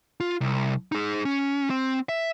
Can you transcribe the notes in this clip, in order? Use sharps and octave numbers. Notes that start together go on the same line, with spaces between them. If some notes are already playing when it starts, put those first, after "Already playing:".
F4
C2
D#4 G#4
C#4
C4
E5